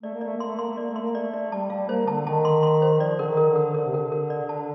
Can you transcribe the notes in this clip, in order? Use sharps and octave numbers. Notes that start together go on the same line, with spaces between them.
A3 D5
A#3
A3 D5
A#3 C6
A3
A#3 C6
A3
A#3 D5
A3
C6
A#3
A3 D5
D5
G3 A5
G3 F5
A#3 C5
D3 A5
D#3 A5
C6
C6
C5
F3 D5
D3 A#4
D#3
A#4
D3
A#4
D3 A#4
C3
D3 A#4
A#4
D5
A5